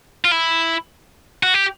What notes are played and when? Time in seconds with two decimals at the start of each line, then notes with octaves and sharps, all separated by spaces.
0.25 F4
0.31 E4
1.43 F#4
1.54 G4